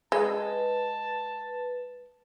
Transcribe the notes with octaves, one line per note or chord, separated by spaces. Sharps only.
G#3 B4 A5